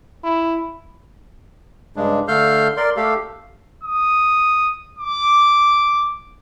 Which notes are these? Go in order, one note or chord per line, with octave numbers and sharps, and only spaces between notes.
E4
G2 C#3 G#3 D4
D3 A3 A4 F5 F6 G6
A#4 D5 C6
A3 G4 A4 F5
D#6
D6